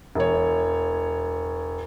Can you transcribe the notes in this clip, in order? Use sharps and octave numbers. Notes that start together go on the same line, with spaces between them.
E1 C#5